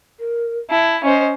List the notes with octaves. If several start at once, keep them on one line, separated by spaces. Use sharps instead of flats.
A#4
E4 A5
C#4 C5 D#5